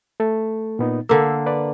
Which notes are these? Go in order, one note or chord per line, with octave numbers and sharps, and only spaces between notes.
A3 A4
A#2 B3 D#4
D3 A#3 E6
B4 D5